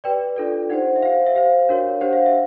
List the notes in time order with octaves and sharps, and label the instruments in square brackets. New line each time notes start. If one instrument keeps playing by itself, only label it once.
[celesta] G4 B4 D5 G5
D4 F4 A4 D5
D#4 G4 C5 F#5
E5
G4 C5 F5
E5
G4 C5 F5
D4 F#4 A#4 C#5
D4 G4 C5 F#5
F5
E5